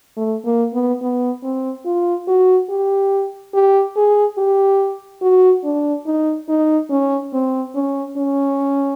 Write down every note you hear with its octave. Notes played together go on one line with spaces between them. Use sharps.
A3
A#3
B3
B3
C4
F4
F#4
G4
G4
G#4
G4
F#4
D4
D#4
D#4
C#4
C4
C#4
C#4